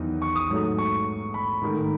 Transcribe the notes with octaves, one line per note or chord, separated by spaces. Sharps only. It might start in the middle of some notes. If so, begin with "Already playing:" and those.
Already playing: E2 D#3 F#3 B3 D#4
C#6
D#6
G#2 F#3 A3
C#6
B5
G#2 D#3 A3